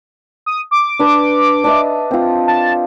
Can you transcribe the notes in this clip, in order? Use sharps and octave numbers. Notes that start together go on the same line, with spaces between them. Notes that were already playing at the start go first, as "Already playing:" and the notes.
D#6
D6
D4 B4
D4 D#5 E5
C4 F4
A5